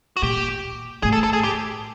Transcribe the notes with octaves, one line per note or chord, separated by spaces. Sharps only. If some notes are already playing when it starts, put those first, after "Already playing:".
F#4
A#2 G4
A2 G#4
A4
A4
G#4
G4